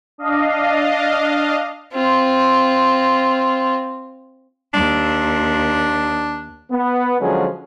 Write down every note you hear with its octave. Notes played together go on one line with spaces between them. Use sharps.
D4 D#5 F5
C4 F4
D#2 D4
B3
D3 F3 F#3 G#3 C#4 G#4